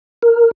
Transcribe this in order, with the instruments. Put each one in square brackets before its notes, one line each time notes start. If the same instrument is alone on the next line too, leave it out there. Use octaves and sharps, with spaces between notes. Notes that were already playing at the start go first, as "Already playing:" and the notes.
[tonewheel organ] A#4